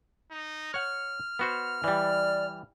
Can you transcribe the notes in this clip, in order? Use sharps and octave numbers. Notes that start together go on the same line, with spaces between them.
D#4
C#5 F#5 F6
B3 F#4 C5
E3 G3 D5